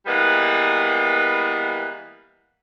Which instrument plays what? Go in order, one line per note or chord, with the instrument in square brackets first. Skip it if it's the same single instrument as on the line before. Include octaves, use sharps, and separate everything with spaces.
[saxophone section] E3 G3 G#3 A#3 B3 B4